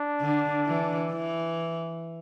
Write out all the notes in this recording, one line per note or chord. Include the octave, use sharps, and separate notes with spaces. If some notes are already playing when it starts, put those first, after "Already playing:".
Already playing: D4
D3
E3
E3